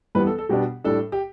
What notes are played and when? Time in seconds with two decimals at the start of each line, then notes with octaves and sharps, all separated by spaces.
0.15 G2 E3 G3 B3 B4
0.27 A4
0.38 A4
0.49 B2 G3 B3 D4 G4
0.84 A2 G3 D4 A4
1.12 G4